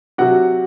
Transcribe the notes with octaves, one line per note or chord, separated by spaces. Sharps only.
C3 F#3 F#4 F#5